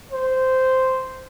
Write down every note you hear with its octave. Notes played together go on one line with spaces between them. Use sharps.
C5